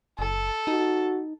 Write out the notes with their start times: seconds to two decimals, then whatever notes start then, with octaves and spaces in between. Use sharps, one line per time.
0.19 F#1 A4
0.67 D#4 F#4